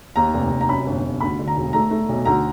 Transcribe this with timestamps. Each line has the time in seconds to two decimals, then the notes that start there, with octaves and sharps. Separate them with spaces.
0.16 D#2 A#5
0.34 F1
0.51 F1
0.61 A#5
0.69 F#2 B5
0.86 G1
1.04 G1
1.20 D2 B5
1.39 D3
1.48 A#5
1.57 E1
1.73 A3 A#5
1.91 A3
2.09 B1
2.25 D2 A#5